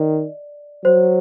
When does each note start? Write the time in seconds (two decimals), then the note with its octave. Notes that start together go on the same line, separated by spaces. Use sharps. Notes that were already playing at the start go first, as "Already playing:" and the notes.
Already playing: D#3 D5 D#5
0.84 F#3 C5